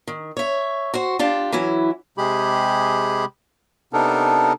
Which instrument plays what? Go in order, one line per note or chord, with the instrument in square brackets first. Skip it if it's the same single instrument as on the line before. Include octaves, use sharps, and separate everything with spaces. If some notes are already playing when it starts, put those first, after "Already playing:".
[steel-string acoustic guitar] D#3
C#5 E5
F#4 C5
D4 F4 G4
E3 F#3 C#4 E4
[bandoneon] C3 G#3 G4 G#4 B5
C3 B3 D4 D#4 A4 A#4